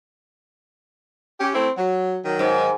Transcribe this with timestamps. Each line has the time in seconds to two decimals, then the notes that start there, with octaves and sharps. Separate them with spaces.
1.40 C#4 G4
1.54 A3 C4 E4
1.77 F#3
2.25 D#3 F#3
2.39 G#2